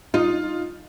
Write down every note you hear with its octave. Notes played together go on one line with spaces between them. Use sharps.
D#4 F4